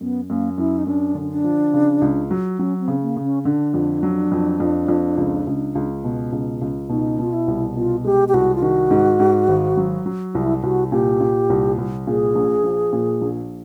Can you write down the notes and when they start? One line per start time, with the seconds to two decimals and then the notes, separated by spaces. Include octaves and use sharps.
0.01 F#2 B3
0.29 F#2 A#3
0.58 F#2 E4
0.78 D#4
0.87 F#2 D4
1.15 D3
1.31 D4
1.44 F3
1.74 C#3
2.01 C#2
2.31 F#3
2.59 F#3 C#4
2.80 C4
2.88 C#3
3.02 A#3
3.17 C#3
3.24 C#4
3.45 D3 D4
3.74 F2
4.03 F#3
4.32 F2
4.60 F2
4.88 F2
5.17 C#2
5.47 C#2
5.75 C#2
6.04 B2
6.32 C#2
6.61 C#2
6.89 B2 D#4
7.19 B2 F4
7.33 E4
7.48 C2
7.76 B2 F4
8.04 G#3 G4
8.28 G4
8.34 C2 F#4
8.56 F4
8.62 D#3 F#4
8.91 G#2
9.20 G#2
9.48 G#1
9.77 F#3
10.06 F#3
10.34 C2 E4
10.63 C2 F#4
10.91 A#2 G4
11.20 A#2
11.50 C2
11.78 C2
12.07 A#2 G#4
12.35 A#1
12.64 F3
12.93 A#2
13.22 A#1